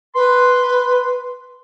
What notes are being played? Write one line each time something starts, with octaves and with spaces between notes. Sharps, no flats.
B4 C6